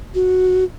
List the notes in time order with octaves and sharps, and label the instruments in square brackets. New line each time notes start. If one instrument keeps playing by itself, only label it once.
[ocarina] F#4